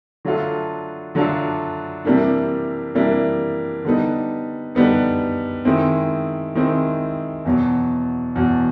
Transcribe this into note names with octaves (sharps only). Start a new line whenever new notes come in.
D3 F#3 A3 D4 F4
D3 F#3 A3 D4 F4
C3 E3 G3 A#3 D4
C3 E3 G3 A#3 D4
D3 G3 B3 D#4
D3 G3 B3 D#4
D#3 G#3 C4 E4
D#3 G#3 C4 E4
E2 B2 F#3
E2 B2 F#3